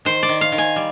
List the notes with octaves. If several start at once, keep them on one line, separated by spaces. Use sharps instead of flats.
D#3 C5
D5
D#3
F5
D#3
G#5
G3